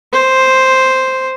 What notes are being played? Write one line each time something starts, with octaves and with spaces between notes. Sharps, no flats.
C5